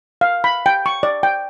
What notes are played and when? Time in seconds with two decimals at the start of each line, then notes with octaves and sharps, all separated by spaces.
0.21 F5
0.44 B5
0.66 G5
0.86 C#6
1.03 D5
1.23 G5